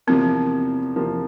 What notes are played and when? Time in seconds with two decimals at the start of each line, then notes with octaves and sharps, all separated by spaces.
0.07 E2 C3 F3 A#3 C4
0.96 E2 C3 F3 A#3